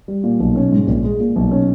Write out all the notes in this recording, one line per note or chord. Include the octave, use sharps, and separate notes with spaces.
G3
A#2
B1
C#4
G#2
A#1
G#3
A#2
B1
C#4